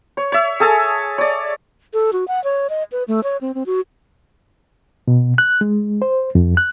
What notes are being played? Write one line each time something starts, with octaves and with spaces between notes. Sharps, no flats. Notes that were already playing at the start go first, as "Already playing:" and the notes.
C#5
C#5 E5
G#4 A4 G#5 A5
C#5 D5
A4
F#4
F#5
C#5
D#5
B4
A3
C#5
C4
C4
F#4
B2
F#6
G#3
C5
F2
F#6